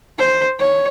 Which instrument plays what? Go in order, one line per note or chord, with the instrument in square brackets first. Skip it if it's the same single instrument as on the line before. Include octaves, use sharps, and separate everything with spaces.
[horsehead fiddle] C5
C#5